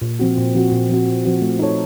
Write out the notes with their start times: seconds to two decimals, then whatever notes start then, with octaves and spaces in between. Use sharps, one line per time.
0.02 A#2
0.19 F3 C4 F#4
0.37 A#2
0.54 F3 C4 F#4
0.72 A#2
0.89 F3 C4 F#4
1.08 A#2
1.25 F3 C4 F#4
1.42 A3
1.59 D#4 A4 C#5